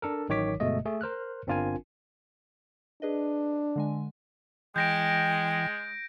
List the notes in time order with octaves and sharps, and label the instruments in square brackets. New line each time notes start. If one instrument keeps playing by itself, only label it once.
[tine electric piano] D4 A4 A#4
A1 D#3 F#3 C#5 D6 B6
G1 B2 G#3 A3 D#5
A3 G#4
A#4 C5 F6 F#6
G1 C4 D4 F4 A#4 G#5
[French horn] D4 [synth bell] G#4 B4 D#5
[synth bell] D3 G#3 G#5
[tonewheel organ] E3 [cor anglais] G#3 [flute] G5 [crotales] G6 A#6 D7